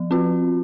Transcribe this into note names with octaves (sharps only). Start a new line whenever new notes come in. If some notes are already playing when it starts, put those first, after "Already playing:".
Already playing: F3
C4 F4